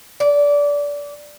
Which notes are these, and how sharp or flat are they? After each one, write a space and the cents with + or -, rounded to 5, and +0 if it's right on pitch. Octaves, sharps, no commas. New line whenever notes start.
D5 -20